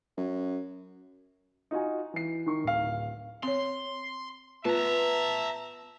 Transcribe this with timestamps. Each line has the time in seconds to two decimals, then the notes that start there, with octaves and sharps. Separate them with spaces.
0.17 F#2
1.71 D#4 F4 F#4 G#5
2.14 E3 C7
2.46 D#3 A#4 C#6
2.64 D1 F5
3.43 C4 C#5 C6
4.65 B3 F4 E5 A5 A#5